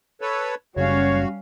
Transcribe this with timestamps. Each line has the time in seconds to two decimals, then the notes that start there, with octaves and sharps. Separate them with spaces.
0.21 A4 B4 C#5
0.76 F#1 G3 C#4 F#4 C#5 F5